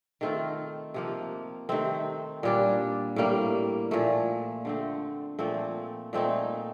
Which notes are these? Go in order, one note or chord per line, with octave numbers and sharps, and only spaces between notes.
D#3 A3 C4 F4
C3 F3 A#3
C3 D#3 A3 C4
A#2 G3 D4
A2 G3 A#3
A#2 F3 A3
D3 A3 C4
A#2 F3 A3 C4
A#2 A3 C4 D#4